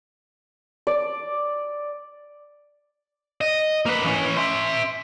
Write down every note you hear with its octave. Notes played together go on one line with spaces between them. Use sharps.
D5
D#5
A#3 B4
E3 C#4
E5 C6